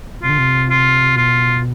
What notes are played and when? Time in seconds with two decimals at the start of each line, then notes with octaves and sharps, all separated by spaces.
0.22 C3 F4
0.29 D3
0.38 C3
0.70 F4
1.16 B2 F4